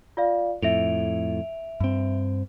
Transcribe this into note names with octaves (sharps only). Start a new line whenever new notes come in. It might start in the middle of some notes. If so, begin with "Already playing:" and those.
F4 D5 F5
F2 A2 E5 D7 F7
G2 C4